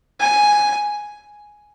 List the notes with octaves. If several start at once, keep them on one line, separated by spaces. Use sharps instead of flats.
G#5